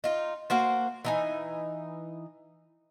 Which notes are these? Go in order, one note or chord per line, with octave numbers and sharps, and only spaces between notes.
D#4 F4
A#3 F#4 C5
E3 D#4 G#5